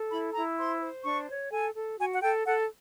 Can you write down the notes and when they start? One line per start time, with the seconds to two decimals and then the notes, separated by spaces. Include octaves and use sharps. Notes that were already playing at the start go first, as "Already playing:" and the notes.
Already playing: A4
0.10 E4 B5
0.34 E4 A#5
0.57 C5 C6
0.81 C5
1.04 D4 C#6
1.27 C#5
1.51 A4 G#5
1.74 A4
1.98 F#4 G#5
2.13 F#5
2.21 A4 G5
2.44 A4 F#5